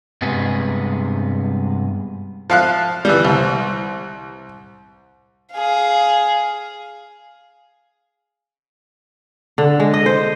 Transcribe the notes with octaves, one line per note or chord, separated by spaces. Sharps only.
G2 C3 G#3 B3 G#4
F3 F5 F#6
E3 G3
C2
G#4 F5
D3
G#3
D#5
C5